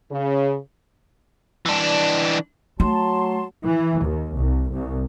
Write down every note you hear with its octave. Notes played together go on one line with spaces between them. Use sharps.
C#3
E3 D4
F#3 A3 A5 C6
E3
D#2
C2
C2